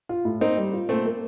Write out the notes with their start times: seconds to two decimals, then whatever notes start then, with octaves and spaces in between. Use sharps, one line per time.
0.09 F4
0.25 A2
0.41 A#3 C4 D#4
0.57 G3
0.73 F4
0.89 A#2 A3 C4
1.06 A#3